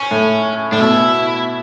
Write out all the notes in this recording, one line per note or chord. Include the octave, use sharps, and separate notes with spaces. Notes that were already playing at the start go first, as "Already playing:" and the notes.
Already playing: C#4
A2
A2 D4
B2 E4